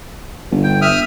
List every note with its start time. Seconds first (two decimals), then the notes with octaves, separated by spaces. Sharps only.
0.51 G1
0.63 G5
0.82 E5 D#6 F6